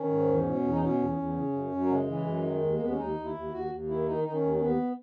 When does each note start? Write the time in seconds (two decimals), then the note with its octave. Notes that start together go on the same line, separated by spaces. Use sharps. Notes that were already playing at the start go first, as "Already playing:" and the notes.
Already playing: D#3 C#4
0.08 G#2
0.26 E2
0.45 B2
0.63 E2
0.71 D#4
0.81 B2 C#4
0.99 E2
1.17 E2
1.34 C#3
1.53 F#2
1.71 F#2
1.80 F#3
1.89 C#3 G#3
2.07 E3
2.25 F#2
2.43 D#3
2.61 D#2
2.73 A#3
2.79 D#2 B3
2.89 C#4
2.98 D#2 D#4
3.16 D#2
3.24 E4
3.34 D#2
3.51 D#2 F#4
3.70 D#2
3.88 D#3 E4
4.06 D#3 D#4
4.24 D#3 D#4
4.33 C#4
4.42 D#2
4.54 C#4
4.60 D#2 B3